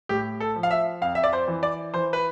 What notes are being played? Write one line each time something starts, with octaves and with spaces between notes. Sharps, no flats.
A2 G4
A4
F3
F5
E5
F2 F5
E5
D5
C5
E3
D5
E3 C5
B4